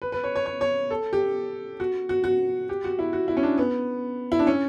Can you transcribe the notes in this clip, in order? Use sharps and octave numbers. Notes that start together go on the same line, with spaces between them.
B4
B4
C#5
C#5
C#5
C#5
A4
G4
F#4
F#4
F#4
G4
F#4
E4
F#4
E4
C#4
D4
B3
E4
D4
C#4